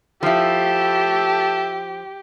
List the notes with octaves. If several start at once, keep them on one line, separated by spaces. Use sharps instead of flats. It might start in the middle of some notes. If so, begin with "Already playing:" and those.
F3 E4 G4 A4 E5 A5